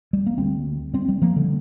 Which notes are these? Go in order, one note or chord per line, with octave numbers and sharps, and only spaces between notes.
G3
A#3
D2 D3 G3 C4
G3 C4
G3 C4
F3 A#3
D3 G3